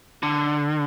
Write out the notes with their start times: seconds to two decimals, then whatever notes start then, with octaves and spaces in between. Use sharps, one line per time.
0.23 D3